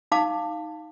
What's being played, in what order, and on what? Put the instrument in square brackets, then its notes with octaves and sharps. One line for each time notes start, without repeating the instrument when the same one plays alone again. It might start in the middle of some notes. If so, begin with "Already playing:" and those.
[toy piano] D#4 F5 A5 D6